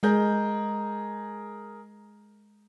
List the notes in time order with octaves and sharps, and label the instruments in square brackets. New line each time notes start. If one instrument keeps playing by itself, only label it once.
[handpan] G#3 [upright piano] G#4 A#4 G6